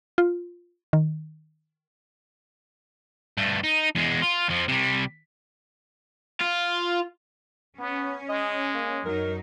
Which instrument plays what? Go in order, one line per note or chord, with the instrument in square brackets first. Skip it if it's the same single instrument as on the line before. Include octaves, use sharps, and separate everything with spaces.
[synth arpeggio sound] F4
D#3
[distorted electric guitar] G2 A3
D#4
E2 G#3
F4
F2 F3
C3 G3
[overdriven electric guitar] F4
[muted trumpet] B3 [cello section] C#4
[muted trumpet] G#3 [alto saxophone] D#5
[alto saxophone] A#3
[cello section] F#2 F#3 D#4 [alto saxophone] A#4